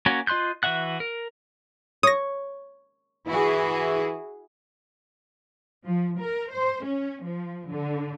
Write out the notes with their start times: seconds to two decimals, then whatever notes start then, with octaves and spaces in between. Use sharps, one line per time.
0.06 A#3 C#4 F#4 C#5
0.27 F4 D#5 C6 F#6 G6
0.63 E3 F#4 E5 F#5 F#6
1.00 A#4
2.03 C#5 D#6 A#6
3.27 E3 E4 F#4 G#4
5.85 F3
6.21 A#4
6.52 C5
6.85 C#4
7.25 F3
7.70 D3